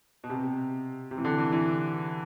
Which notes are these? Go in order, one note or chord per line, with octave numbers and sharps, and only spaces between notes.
B2
C3
C3
E3
D3
E3
E3